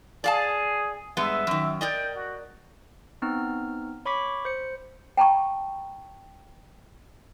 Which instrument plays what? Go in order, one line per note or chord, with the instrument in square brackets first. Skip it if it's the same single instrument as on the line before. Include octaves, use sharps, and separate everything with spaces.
[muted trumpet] G#4 [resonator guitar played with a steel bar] D5 F5 A5
[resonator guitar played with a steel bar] G2 G#3 B3 [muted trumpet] E5
[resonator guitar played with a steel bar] F#2 D#3
[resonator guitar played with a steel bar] A#4 D5 D#5 [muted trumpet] G5
[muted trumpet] F#4
[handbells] B3 C4 D#4 F6
C#5 B5 C#6 D6 B6
C5 C#7
[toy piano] G5 A5 A#5 C#6